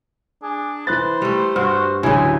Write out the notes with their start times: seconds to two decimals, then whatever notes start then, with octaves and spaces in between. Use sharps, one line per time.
0.43 D4 G#4
0.87 E3 B4 C5 F#6 A6
1.22 G3 A3
1.56 G2 F#4 C5 F6
2.03 A1 D2 C#3 E3 F#3 G#3 G#5